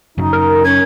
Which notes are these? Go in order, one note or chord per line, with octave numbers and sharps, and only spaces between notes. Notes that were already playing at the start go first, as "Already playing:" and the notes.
F#2 C#3 F#3 D#4
A#4
C#4 G#6